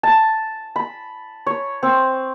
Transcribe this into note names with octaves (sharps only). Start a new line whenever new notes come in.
A5
B5
C#5
C4